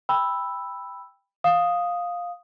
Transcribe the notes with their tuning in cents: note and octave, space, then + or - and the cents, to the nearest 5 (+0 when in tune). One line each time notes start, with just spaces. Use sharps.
G5 +20 B5 +0 E6 +0
F5 +10 D#6 +0